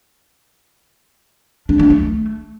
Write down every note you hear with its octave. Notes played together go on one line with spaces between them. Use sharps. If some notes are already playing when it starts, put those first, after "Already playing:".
D4
A#3
A3